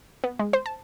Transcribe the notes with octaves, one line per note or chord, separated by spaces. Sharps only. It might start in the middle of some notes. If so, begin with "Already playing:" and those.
B3
G#3
C5
A5